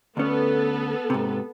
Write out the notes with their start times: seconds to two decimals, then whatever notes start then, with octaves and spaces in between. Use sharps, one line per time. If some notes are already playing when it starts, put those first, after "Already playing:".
0.17 D2 B3 C#4 A4
1.10 G#2 C3